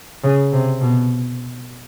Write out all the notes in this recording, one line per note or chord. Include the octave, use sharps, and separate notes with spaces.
C#3
C3
B2